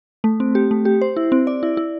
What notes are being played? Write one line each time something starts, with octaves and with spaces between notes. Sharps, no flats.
A3
C4
G4
A3
G4
C5
E4
C4
D5
E4
E4